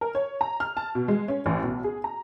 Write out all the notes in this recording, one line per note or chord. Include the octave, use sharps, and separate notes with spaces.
A#4
C#5
A#5
F6
A5
B2
G#3
C#4
A1
B1
G#4
A#5